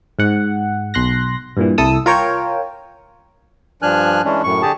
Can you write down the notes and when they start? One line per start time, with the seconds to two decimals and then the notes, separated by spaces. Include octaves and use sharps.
0.19 G#2 F#5
0.94 B1 C6 F#6 A#6
1.57 G2 A#2 E3
1.78 C2 E4 A4 D#6 E6
2.06 F4 A#4 C#5 G5
3.82 G2 F3 D4 G#5 F6 F#6
4.25 E3 G#3 C#4 D4
4.44 F#2 A2 C#6
4.62 D3 G4 G#4 A5